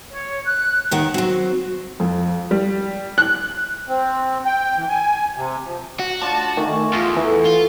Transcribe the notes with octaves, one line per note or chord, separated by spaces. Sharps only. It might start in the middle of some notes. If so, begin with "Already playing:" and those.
C#5
F#6
D#2 D#3 F#5
F#3 C4 F#4
F2
G3
F#6
C4
G5
E3
G#5
C3
F3
F#4
D4 F4 A5
D#3 A3 G#5 C#6
E2 F4
E3 A4
F4